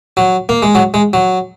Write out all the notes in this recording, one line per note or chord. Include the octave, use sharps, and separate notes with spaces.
F#3
A#3
G#3
F#3
G#3
F#3